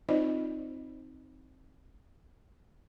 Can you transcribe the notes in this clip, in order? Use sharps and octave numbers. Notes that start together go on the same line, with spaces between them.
C4 D#4 F4 C5 D5 D#5